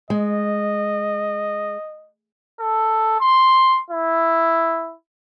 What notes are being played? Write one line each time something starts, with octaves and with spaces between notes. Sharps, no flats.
G#3 D#5
A4
C6
E4